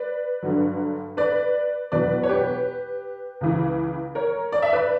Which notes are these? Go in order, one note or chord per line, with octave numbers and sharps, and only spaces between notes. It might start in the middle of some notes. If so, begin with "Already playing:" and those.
Already playing: B4 D5
G2 D3 F#3
B4 D5
E2 B2 F#3 B4 D5
C#5
G4 B4
C#2 C#3 E3
A#4 C#5
D5
E5
B4 D5